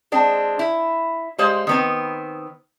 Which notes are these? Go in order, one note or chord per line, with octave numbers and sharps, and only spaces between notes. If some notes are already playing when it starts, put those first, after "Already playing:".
G#3 C4 D4
E4
G3 G#3 C5 F5
D#3 B3 C4